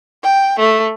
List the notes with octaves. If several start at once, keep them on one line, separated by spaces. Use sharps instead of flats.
G5
A3